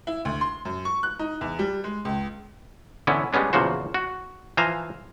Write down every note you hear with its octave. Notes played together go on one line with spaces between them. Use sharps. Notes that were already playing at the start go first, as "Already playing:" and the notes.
E4
D2
C6
F#2
C#6
F#6
D#4
E2
G3
G#3
C#2
D3 E3 B3 C#4 E4
G3 G#3 B3 C#4 D4
E2 A#2 C#3 F3 F#4 C5
F#4
E3 F3 C5 F5 G#5 A#5